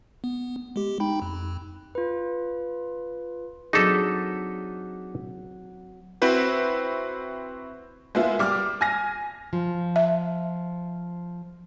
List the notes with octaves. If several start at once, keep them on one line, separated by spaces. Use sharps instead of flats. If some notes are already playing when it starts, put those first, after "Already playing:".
B3
G#3 G4
D#4 G5 B5
F2
F4 B4
F#3 C4 D4 D#4 G#4 A4 D6 B6
C4 E4 F#4 B4 C5
G#3 A#3 B3 E4 F4
G3 D6 F6
G#5 F6 A#6
F3
E5